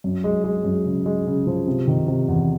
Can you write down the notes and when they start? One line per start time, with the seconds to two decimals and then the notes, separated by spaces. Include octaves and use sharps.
0.04 F#2
0.24 G#3
0.44 G#3
0.64 F#2
0.85 C#3
1.06 G#3
1.27 C#3
1.47 F3
1.67 C3
1.88 D#3
2.07 C3
2.28 E2